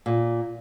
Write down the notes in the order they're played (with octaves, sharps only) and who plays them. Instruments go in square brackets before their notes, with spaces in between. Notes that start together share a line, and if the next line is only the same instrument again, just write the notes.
[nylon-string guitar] A#2